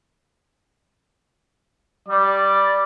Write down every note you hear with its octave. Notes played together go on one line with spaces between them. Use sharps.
G3 D5